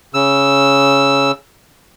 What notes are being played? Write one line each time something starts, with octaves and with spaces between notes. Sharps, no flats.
C#3 E6